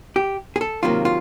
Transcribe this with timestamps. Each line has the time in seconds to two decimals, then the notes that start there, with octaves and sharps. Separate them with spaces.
0.16 G4
0.56 G#4
0.61 A4
0.83 C3 D#3 F#3 A#3 F4
1.05 F4